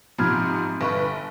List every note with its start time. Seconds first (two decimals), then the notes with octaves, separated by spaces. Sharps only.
0.18 G#2 C3 F3 B5 F6 G#6
0.81 G1 B4 F5 C#6